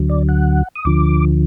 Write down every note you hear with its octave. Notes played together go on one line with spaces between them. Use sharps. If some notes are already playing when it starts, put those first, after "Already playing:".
Already playing: D2 D3 F#3
D5
F#5
D#6
D2 D3 F3 D6